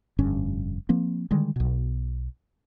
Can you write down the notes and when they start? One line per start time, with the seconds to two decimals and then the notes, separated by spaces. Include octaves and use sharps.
0.19 F1 G2 D3 C#4
0.89 F3 A#3 C4
1.31 D3 D#3 G3 G#3
1.56 B1 B2